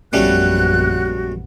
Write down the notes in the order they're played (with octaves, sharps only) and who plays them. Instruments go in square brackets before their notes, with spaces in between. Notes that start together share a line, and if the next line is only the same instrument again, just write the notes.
[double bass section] A#1 F#2 B3 [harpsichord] G3 A3 C#4 [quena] F#4 [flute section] F#6